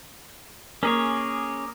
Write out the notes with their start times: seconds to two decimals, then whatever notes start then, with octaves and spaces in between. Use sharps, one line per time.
0.83 A#3 C#4 G#4 C#5 D6